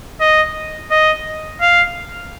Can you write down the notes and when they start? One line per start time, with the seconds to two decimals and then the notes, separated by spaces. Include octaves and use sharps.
0.21 D#5
0.91 D#5
1.61 F5